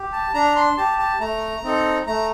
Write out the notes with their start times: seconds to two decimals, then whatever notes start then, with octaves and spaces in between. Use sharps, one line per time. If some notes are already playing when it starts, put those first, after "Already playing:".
Already playing: G4
0.12 A5
0.34 D4 A#5
0.56 C6
0.77 G4 A5
0.99 A5
1.20 A3 A#5
1.63 C4 D#4 A4
2.07 A3 A#5